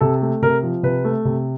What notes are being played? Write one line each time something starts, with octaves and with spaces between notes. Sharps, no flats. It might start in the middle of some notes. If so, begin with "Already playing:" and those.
C3 A4
A3
C3 A#4
F3
C3 B4
A3
C3